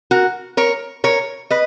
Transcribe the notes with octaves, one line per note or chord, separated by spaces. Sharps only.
F#4 A#4
A#4 C#5
A#4 C#5
B4 D#5